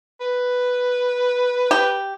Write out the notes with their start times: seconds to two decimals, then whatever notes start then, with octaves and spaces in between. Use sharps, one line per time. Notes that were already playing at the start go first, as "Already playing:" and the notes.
0.21 B4
1.71 G4